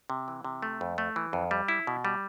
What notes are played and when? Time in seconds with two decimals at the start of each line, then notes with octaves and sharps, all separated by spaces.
0.10 C3
0.28 E3
0.45 C3
0.62 A3
0.81 F2
0.98 A3
1.16 E3
1.33 F2
1.51 G3
1.68 E4
1.87 B2
2.05 G3